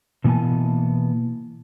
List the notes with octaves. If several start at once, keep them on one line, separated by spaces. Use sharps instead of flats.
B2 E3 A#3 B3 G#5 A5